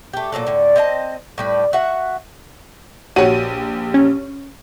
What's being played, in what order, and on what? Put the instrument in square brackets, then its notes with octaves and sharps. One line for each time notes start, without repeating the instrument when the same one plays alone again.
[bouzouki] A3 G4
A#2 C#3 F#3 A4
A2 D3
C4 D#5 E5 A5
A2 G3 B4
F#4 E5 F#5
[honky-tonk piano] A#1 G4 D#7 [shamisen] F#4 C#5
[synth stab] C#4